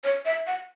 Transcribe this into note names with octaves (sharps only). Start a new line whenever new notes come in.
C#5
E5
F#5